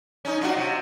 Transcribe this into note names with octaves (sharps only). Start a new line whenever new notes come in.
C#4 D#4
D4 F4 F#4
C3